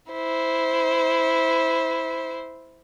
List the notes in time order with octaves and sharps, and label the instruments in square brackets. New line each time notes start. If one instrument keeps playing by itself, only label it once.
[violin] E4 C5